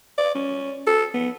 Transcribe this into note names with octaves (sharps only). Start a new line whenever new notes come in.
D5
C#4
A4
B3